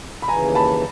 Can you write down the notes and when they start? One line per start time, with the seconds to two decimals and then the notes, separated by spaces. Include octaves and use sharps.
0.22 B5
0.28 D#2 C#3 E3 G#5 A#5
0.55 A5 B5